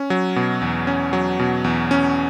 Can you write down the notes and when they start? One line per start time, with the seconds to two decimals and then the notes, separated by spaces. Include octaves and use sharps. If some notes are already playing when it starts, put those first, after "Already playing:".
Already playing: C#4
0.10 F#3
0.36 B2
0.62 E2
0.87 C#4
1.13 F#3
1.40 B2
1.64 E2
1.91 C#4